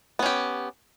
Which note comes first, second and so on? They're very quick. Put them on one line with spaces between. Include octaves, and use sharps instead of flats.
B3 C#4 G4